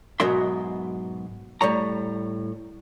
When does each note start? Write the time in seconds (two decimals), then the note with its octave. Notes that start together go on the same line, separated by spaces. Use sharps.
0.20 G#2 B2 F#3 A#4 E5 C6
1.61 A2 G3 C#5 A#5